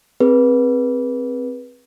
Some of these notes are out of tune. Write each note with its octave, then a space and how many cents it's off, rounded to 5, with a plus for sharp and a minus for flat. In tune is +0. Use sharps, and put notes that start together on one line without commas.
C4 +0 G#4 +0 B4 -25